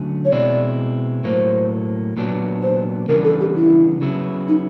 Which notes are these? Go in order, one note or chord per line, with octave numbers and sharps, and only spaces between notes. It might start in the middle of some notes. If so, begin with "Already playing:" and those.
Already playing: D3 F#3 A3 C#4
C#5
B2 G#3 C4 E4 D5
A2 F#3 A#3 C5
A#2 F#3 B3 D4
C5
C#3 E3 G3 B3 D4 A#4
A4
G4
E4
C#3 F#3 B3 E4
D#4